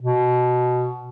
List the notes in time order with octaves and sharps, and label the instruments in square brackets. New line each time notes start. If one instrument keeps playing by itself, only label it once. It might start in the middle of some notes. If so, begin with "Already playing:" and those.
[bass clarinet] B2